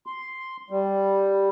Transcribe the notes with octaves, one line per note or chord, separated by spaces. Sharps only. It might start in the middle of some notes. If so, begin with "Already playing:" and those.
C6
G3